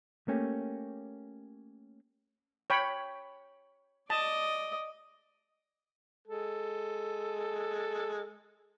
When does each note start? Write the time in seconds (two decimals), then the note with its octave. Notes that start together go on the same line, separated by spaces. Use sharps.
0.28 A3 A#3 C#4 G4
2.70 C#5 G5 B5
4.10 D5 D#5 A5
6.27 G#3 A4